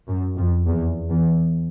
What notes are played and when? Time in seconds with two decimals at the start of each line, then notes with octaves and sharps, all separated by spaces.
0.09 F#2
0.37 F2
0.66 E2
1.10 E2